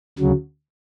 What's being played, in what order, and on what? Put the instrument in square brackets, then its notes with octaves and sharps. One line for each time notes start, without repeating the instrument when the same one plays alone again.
[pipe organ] D2 C#3 F#3